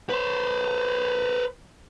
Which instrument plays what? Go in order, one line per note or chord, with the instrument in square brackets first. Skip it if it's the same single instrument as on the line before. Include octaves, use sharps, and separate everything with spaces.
[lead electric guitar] B4 C5